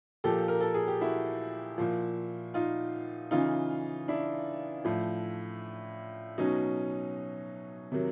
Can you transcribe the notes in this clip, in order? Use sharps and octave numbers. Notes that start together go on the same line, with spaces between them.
A#2 F3 G4 A4
A#4
A4
G#4
G4
E4 F#4
A#2 F3
D#4 F4
C#3 E3 D#4 F4
D4 E4
A2 F3
B2 F#3 C#4 D#4
C3 D#3 F#3